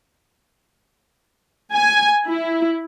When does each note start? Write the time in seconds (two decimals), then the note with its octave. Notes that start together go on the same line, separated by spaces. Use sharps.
1.74 G#5
2.27 E4